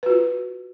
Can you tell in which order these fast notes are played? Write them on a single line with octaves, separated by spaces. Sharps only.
B4 F#4 F4